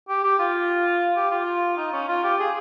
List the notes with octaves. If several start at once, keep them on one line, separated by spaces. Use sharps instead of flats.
G4
G4
F4
G4
F4
D#4
C#4
F4
G4
G#4